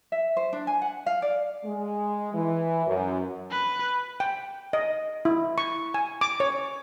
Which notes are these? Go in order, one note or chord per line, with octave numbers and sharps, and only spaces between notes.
E5
C5
D4
G#5
F#5
F5
D5
G#3
E3
F#2
B4
G5
D#5
E4
C#6
G#5
D6
C#5